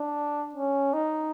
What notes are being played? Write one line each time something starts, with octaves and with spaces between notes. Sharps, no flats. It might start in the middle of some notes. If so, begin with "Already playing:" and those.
Already playing: D4
C#4
D#4